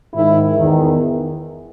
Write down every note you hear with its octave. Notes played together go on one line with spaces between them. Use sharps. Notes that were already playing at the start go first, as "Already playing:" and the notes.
G#2 D#3 E4
E2 D#3